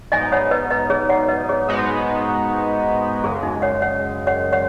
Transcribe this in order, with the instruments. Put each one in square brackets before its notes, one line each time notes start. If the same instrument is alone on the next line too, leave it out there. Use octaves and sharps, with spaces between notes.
[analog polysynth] G#2 F#3 B3 D#4 [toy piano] D#5 G#5
[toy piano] C#5 F#5
B4 D#5
B4 D#5
G#4 C#5
C#5 F#5
B4 D#5
G#4 C#5
[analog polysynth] G#2 G#3 B3 D#4 F#4
[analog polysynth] F#2 C#3 G#3 [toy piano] G#4
[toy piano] D#4
C#5 F#5
C#5 F#5
C#5 F#5
C#5 F#5